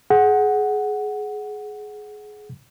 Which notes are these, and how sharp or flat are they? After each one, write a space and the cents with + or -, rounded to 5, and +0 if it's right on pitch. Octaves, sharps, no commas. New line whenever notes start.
G#4 +20 F#5 +0